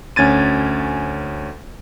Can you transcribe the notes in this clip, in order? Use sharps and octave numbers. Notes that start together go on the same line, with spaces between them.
D2 C#4 G#6 A6 D#7